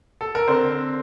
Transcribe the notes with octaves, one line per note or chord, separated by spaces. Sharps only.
A4
A#4
D3 C4 C5